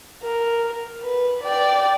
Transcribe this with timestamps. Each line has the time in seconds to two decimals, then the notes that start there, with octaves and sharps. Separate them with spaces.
0.22 A#4
1.02 B4
1.43 D5 G5